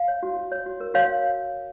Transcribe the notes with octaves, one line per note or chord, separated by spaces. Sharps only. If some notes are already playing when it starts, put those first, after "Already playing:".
Already playing: F5
C#5
F#4
F#4
C#5
F#4
A#4
F#4 C#5 F5